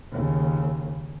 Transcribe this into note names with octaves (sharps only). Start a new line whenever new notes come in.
D#2 C#3